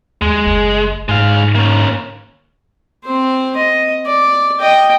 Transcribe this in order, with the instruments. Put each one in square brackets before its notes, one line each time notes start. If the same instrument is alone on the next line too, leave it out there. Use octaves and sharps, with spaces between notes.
[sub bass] D#2 [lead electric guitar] G#3
[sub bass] F#1
[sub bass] G#2 [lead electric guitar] G#3 F5
[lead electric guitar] A#3 C#4
[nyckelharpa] C4 C5
D#5
D5
D#5 G5